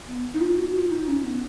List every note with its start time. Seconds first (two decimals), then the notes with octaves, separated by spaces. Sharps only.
0.07 B3
0.34 D#4
0.41 F4
0.58 F#4
0.75 F4
0.91 D#4
1.08 C#4
1.24 B3